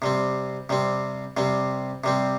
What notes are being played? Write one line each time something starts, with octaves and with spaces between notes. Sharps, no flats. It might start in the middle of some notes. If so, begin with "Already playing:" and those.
C3 G3 C4
C3 G3 C4
C3 G3 C4
C3 G3 C4